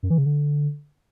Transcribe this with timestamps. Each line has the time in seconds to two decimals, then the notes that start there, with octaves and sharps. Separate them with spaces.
0.03 F#2
0.10 E3
0.18 C#3
0.26 D3